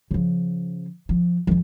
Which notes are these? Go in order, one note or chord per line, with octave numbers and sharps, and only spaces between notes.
C#3 F3
F3
F2 D#3